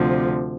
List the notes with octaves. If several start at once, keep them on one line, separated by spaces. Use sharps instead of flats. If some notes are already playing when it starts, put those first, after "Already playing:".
Already playing: D2 C3 F3